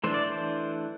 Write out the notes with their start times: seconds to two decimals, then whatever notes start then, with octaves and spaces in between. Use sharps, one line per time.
0.04 E3 A3 D4 C5
0.14 D5
0.26 C5